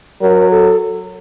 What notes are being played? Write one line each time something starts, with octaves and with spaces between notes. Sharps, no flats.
F#3 A#4
A4